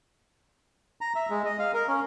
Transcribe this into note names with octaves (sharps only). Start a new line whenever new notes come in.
A#5
E5
G#3
D#5
F5
A#4
C#4